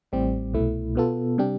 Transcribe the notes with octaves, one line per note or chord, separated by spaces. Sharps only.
A1 A2 G3 C4 G4
C2 B2 A3 E4
B2 B3 F4 A4
C3 G3 D4 G4